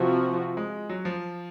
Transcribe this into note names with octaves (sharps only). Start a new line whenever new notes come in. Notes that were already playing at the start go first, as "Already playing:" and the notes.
Already playing: C3 F3 C4 F#4
G#3
F#3
F3